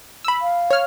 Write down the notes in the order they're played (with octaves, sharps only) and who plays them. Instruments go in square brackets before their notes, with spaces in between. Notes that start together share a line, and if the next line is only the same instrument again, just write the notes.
[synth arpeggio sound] B5 E6
[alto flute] F5
[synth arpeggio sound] C#5 F6